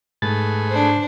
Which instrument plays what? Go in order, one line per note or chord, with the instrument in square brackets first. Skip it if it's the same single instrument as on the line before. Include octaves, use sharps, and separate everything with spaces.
[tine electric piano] G#2 A6 [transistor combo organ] A3 G#4 B4
[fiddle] D4 C5